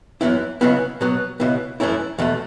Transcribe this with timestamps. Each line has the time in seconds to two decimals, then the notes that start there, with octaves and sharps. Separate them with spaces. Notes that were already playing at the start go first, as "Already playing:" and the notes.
0.21 F#2 E3 B3 E4
0.61 C#2 C#3 F#3 B3 E4
1.01 B2 F#3 B3
1.40 C#2 B2 B3 E4
1.80 F#2 E3 A3 C#4 E4
2.18 E2 B2 A3